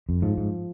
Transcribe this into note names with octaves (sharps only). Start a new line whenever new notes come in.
F2
G#2 F3
G#2